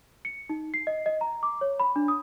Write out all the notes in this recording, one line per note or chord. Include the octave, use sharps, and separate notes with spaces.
C#7
D#4
C7
D#5
D#5
A#5
D6
C#5
B5
D4
D#6